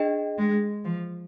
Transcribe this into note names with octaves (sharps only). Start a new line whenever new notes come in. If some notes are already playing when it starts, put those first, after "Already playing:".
Already playing: D4 G#4 D#5 G5
G#3
F3